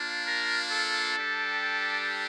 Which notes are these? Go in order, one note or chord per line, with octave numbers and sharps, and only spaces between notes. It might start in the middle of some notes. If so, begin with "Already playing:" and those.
Already playing: A#3 D4 F4
A#4
A4
G3 D4 G4